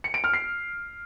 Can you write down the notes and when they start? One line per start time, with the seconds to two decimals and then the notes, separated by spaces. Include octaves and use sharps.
0.04 C#7
0.14 D7
0.24 F6
0.33 C7